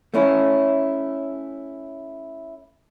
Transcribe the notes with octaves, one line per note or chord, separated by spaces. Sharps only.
A3 C#4 E4